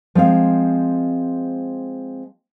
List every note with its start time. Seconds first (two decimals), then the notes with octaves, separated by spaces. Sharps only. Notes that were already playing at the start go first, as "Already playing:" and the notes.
0.15 F3 G#3 C4 F5